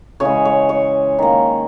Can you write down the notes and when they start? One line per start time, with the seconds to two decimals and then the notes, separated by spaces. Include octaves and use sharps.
0.20 C#3 E3 G#3 C#5
0.45 C#5
0.69 C#5
1.19 D#3 A#3